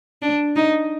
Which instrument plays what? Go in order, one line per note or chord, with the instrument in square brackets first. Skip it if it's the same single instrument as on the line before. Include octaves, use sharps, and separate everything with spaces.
[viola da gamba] D4
D#4